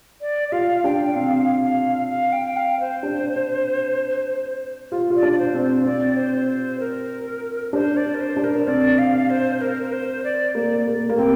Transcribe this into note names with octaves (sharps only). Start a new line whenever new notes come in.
D5
D5
F4 F5
D4 G5
C4 F5
F5
F5
G5
F5
C5
D4
F4
F4 D5
D4
D5
C5
C4
C5
C4 D5
C5
C5
A#4
D4 C5
D5
A#4
C5
D4
A#4
C4 D5
F5
C5
A#4
A#4
C5
D5
A#3 D5
A#3
A#3
C4 G5